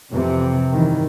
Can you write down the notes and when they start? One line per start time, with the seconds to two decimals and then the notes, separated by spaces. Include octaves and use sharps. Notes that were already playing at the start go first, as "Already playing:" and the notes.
0.12 F2 C3 E3
0.72 G2 D#3 E3